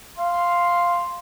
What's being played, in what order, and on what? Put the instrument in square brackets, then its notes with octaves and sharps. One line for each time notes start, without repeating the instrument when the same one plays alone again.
[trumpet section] F5 C6